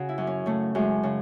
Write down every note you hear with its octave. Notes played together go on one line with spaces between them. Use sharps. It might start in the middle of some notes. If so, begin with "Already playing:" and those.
Already playing: C#3 F#4
E4
F#2
C#4
C#3 A3
F#2 G#3
C#3